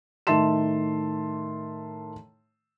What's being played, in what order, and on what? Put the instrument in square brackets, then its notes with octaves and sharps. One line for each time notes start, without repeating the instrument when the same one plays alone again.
[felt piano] A2 D#3 E5 A5 C6 E7